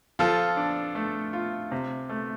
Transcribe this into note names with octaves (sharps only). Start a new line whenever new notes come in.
F3 F4 A4
D4
A3
F4
C3
A3